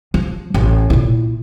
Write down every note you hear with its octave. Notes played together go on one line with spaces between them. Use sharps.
F3
A1
A#2 E4